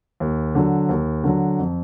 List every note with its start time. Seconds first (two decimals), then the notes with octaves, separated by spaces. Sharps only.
0.20 D#2
0.55 D3 F#3
0.89 D#2
1.24 D3 F#3
1.59 F2